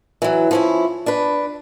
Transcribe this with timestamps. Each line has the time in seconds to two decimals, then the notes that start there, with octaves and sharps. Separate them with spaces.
0.22 E3 F#3
0.51 F3 C#4 E4
1.06 D4 B4